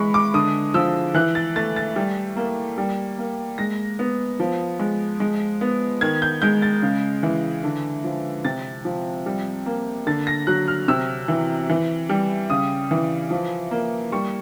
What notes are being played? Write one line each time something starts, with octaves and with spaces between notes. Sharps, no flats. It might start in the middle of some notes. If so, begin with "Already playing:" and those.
Already playing: E3 G#3 B5 C#6
D6
D3 D#6
F3 E6
E3 F#6
A6
A3 A6
A6
G3
A#3
G3
A#3
G#3 A#6
B3
F3
G#3
G#3
B3
D#3 G#6
G6
G#3 G6
A6
C#3
E3
D3
F3
C3 A6
F3
G3
A#3
D3 A6
A#6
F#3 F#6
F6
C3 E6
E3
E3
G3
C#3 D#6
E3
F3
A#3
G3 C#6